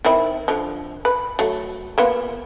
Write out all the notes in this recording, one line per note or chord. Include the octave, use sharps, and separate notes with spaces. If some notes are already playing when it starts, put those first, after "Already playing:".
D#3 C4 E4
D3 F3
B4
F#3 A3
A#3 B3 F4